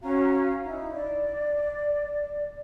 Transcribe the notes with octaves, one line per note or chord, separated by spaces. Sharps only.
C#4 F#4 F5 A#5
D#4 E4
D5